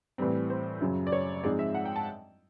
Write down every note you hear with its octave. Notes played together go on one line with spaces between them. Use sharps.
A2 E3 G3 C4
C5
F#2 C#3 F#3
D5
C#5
G#2 F3 G#3 C4 D5
E5
F#5
G5
A5